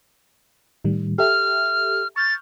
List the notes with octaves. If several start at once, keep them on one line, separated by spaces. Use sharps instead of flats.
A2 D#3 G3
G4 A4 E5 F6
C#6 F6 G6 A6